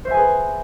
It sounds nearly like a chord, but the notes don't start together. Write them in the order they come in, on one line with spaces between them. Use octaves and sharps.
C5 E5 G#5 G#4 B4